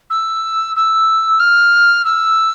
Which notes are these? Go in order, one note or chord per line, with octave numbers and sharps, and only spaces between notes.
E6
E6
F6
E6